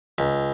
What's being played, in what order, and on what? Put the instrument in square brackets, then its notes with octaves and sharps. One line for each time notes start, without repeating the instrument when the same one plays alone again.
[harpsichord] C#2